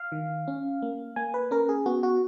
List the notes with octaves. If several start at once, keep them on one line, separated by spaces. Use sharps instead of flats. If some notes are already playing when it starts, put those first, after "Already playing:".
Already playing: F5
D#3
C#4
A#3
A#3 G#5
B4
C#4 A#4
G#4
B3 F#4
F#4